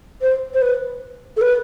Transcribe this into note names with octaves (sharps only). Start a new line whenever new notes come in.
C5
C5
B4
A4
B4